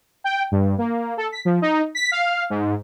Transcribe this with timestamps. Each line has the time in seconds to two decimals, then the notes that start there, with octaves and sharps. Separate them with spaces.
0.24 G5
0.52 G2
0.78 A#3
1.17 A4
1.32 B6
1.45 F3
1.62 D#4
1.95 B6
2.12 F5
2.50 G#2